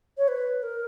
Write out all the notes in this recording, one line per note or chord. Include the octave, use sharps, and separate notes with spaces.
C#5
B4
A#4